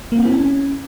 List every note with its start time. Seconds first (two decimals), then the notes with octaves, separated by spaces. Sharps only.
0.12 A#3
0.19 C4
0.25 E4
0.32 C#4